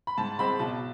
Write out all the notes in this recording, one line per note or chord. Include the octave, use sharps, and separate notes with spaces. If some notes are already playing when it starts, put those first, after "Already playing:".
B5
G#2 A5
G#3 C4 B5
B1 A5